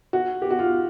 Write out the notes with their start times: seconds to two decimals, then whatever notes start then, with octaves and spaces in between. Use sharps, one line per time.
0.13 F#4
0.42 G4
0.51 F#4
0.59 F4